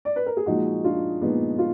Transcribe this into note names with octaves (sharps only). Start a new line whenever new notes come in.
D5
B4
A#4
G#4
A#2 F3 G#3 D#4 F#4
D4 F4
A#2 F3 G#3 B3 D#4
F4